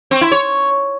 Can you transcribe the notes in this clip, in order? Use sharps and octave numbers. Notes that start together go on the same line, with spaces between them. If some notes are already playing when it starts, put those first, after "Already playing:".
C4
E4
C#5